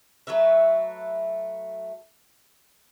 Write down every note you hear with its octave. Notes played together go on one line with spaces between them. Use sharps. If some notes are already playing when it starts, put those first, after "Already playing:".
F#3 A3 B4 E5